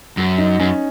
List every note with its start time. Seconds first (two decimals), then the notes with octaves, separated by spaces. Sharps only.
0.17 F#2
0.38 D#4
0.59 F#2 C#4